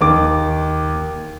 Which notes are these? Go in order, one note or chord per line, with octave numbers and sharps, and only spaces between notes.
D#2 D6